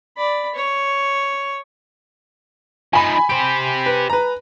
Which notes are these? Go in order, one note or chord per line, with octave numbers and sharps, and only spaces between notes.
D5 B5
C#5
F3 D#4 G#5 B5
G4 C5 D7
B4
B4 A#5